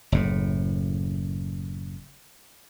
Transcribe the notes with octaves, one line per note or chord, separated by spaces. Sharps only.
F#1 A2